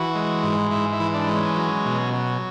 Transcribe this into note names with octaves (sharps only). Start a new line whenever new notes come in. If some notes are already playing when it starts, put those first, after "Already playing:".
Already playing: E3 F#4
G#3
G#2
G#2 E4
E4
E3
D4
G#3
C#4
F#3
B2
F#3